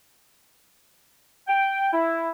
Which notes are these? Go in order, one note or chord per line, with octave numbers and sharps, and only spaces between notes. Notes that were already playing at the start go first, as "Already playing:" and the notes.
G5
E4